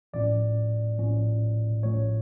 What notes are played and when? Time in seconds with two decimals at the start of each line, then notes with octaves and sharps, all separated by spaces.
0.13 A#1 A2 F3 C#4 D5
0.98 A#1 A2 F3 C#4
1.83 A1 A2 F3 A3 C#4 C#5